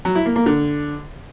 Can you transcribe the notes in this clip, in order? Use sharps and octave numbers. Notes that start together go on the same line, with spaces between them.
F#3
E4
A#3
A#3
D3